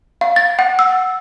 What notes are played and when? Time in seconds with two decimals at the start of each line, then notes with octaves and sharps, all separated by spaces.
0.21 F5
0.36 A6
0.59 F#5
0.79 E6